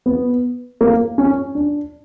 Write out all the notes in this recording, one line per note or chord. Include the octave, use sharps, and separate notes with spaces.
B3
A#3
C#4
D4